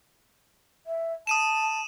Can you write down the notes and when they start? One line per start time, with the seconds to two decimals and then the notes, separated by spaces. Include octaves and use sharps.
0.86 E5
1.27 A5 D#6 D#7 E7